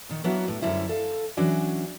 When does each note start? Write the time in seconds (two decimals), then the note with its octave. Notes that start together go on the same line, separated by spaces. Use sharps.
0.09 A#2 D#3
0.24 F#3 A#3 B3 D4 E4 F#4
0.48 A2
0.61 F#2 D3 G3 E4 C5
0.89 A4 F5
1.37 E3 F#3 C#4 D4 F#4